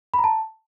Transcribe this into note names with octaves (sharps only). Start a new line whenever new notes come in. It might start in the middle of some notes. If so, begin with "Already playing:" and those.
B5
A#5
A5